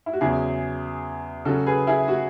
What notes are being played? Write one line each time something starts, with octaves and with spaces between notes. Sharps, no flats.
E4
F#4
E2 C#3 F#3 E4 G#4
C#3 F#3 C#4 F#4 A4
G#4 B4
E4 G#4
F#4